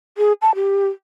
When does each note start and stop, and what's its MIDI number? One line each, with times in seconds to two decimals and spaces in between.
0.18 0.33 68
0.42 0.55 81
0.55 0.88 67